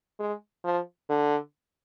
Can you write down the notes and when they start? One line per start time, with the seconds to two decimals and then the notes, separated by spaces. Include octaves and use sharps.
0.20 G#3
0.65 F3
1.10 D3